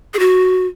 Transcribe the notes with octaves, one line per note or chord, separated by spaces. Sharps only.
G#4
F#4